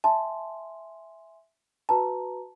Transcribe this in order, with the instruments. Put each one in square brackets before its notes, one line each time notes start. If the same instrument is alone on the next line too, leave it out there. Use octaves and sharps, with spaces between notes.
[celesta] E5 G#5 C6 [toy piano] A5
[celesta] F#4 B4 A#5 [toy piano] A5